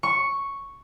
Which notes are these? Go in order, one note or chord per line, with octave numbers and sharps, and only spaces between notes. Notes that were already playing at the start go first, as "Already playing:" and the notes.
C#6